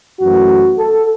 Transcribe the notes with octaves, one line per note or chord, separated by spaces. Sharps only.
F#2 E3 A3 F#4
A4